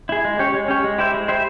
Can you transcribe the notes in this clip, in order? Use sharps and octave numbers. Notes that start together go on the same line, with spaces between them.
E4 G#4
G#3
C#4 G4 C#5
G#3
C#4 G4 C#5
G#3
E4 G4 C5 E5
G#3
E4 G4 C5 E5